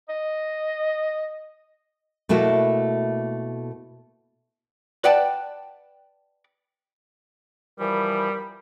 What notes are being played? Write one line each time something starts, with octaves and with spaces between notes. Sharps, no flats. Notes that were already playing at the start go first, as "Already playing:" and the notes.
D#5
B2 A3 A#3 E4 F#4
B4 D5 F#5 G5 A5
E3 F3 G3 A#4 B5